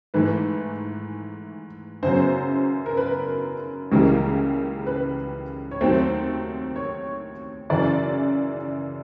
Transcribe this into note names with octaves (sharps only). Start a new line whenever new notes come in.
G#2 E3 A3 B4
F#2 C#3 F#3 B3 C5
A#4
B4
C#2 C#3 E3 G3 A#3 A#4
B4
C#5
D#2 D#3 F#3 A3 C4 C5
C#5
F#2 C#3 E3 D5